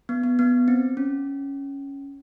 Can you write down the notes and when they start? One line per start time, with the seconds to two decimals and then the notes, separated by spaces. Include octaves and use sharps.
0.09 B3
0.23 B3
0.39 B3
0.68 C4
0.97 C#4